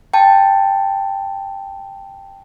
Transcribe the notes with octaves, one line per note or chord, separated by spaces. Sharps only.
G5 A5